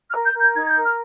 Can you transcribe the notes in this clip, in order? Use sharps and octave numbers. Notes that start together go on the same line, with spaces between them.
F6
A#4
G6
A#4
G6
D#4 G#6
G#6
G6
A#4
F6